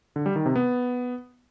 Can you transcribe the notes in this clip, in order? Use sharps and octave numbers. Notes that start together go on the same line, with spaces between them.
D3
G3
D#3
C3
B3